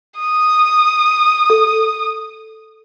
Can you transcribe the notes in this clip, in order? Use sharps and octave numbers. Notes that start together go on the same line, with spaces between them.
D#6
A4